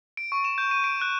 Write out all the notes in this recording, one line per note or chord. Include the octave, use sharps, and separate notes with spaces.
D7
C#6
E7
G6
D#7
D7
F#6